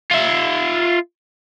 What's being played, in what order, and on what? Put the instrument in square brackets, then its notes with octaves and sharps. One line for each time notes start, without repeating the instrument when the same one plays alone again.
[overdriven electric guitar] F4 E5